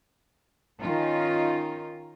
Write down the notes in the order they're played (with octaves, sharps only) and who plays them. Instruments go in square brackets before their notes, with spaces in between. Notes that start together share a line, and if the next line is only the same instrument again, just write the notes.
[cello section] D#3 C#4 D#4 F4